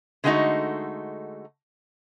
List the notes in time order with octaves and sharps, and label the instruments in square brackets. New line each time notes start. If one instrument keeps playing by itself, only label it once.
[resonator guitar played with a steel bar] D3 G#3 A3 B3 D#4 F#4